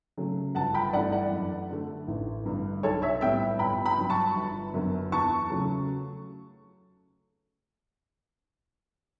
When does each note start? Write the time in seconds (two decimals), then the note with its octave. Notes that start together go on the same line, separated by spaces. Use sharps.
0.17 C#3 F#3 A3
0.55 G1 F#5 A5
0.74 G5 B5
0.93 G2 E3 A3 D5 F#5
1.12 D5 F#5
1.31 F#2
1.70 D3 A3
2.08 A1
2.46 G2 D3
2.83 B1 A4 C#5
3.02 C#5 E5
3.21 A2 G3 B3 E5 G5
3.59 G1 G5 B5
3.86 G5 B5
3.98 G2 F#3
4.10 A5 C#6
4.36 G1
4.74 F#2 D3 F#3 B3
5.12 E2 A5 C#6
5.50 C#3 F#3 A3